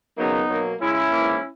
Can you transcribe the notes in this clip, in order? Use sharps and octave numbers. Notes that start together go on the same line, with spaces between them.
C#3 F#3 A#3 B3 D#4
B2 F#3 A#3
C#3 G#3 C#4 E4
G#2 E3 A#3